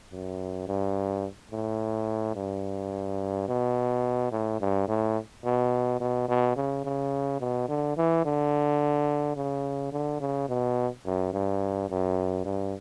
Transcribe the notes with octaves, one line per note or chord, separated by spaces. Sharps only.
F#2
G2
A2
G2
B2
A2
G2
A2
B2
B2
B2
C#3
C#3
B2
D3
E3
D3
C#3
D3
C#3
B2
F#2
G2
F#2
G2